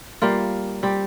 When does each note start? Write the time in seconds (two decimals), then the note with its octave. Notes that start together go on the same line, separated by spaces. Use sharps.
0.22 G3 A#3 F4
0.83 G3 C4 G4